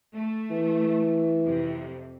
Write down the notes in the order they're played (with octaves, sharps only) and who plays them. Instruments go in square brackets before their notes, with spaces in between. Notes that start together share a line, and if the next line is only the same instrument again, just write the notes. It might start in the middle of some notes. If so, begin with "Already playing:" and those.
[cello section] A3
[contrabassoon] E3
[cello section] F2 C3